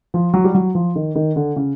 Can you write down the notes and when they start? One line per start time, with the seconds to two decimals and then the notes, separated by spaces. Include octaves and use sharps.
0.14 F3
0.34 F#3
0.44 G3
0.54 F#3
0.75 F3
0.96 D#3
1.15 D#3
1.36 D3
1.56 C#3